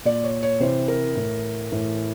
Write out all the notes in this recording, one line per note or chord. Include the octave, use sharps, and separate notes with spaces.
A#2 D5
C#5
C#5
C3 E3 C5
A#4
A2 E3
A2 E3